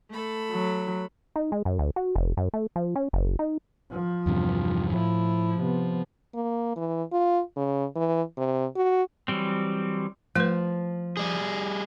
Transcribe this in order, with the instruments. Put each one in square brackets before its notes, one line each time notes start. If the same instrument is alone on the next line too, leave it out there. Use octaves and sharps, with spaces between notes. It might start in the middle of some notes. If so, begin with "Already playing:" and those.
[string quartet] A3 A4 B5
[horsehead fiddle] F#3
[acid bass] D#4
G#3
F#2
D2
F#4
F1
F#2
A3
F3
C#4
F#1
D#4
[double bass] F3
[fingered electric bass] E2 G2 C3
[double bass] A2 E4 [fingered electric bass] F3
[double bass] C3 B3
[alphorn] A#3
E3
F4
C#3
E3
C3
F#4
[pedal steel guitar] E3 F#3 G3 C4
[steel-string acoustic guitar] F3 [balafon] A3 B4
[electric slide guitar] G3 G#4